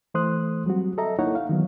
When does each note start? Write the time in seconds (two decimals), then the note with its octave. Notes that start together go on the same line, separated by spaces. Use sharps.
0.14 E3 A3 C5 C6 D#6 F#6
0.66 F#3 G3 C4 F#4
0.98 A4 D#5 E5 A#5
1.19 A#3 D#4 E4 C#5 F#5
1.35 F5
1.49 D#3 E3 F#3 B3